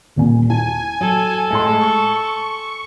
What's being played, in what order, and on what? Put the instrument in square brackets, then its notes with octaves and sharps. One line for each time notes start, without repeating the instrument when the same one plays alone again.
[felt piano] D#1 A#2 G#5
[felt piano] E4 A5 [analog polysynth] G#5
[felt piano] F#3 [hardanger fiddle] A4
[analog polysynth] A2 G#3 [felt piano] G#5 C6
[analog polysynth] C#6